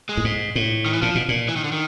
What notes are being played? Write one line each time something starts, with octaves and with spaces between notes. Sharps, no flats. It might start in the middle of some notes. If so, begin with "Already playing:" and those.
G#3
A2
G#2
A2
D#3
E3
A#2 F3
B2
A#2
E3
D#3
D3
D#3